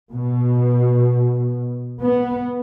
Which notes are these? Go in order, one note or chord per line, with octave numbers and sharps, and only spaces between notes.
B2
B3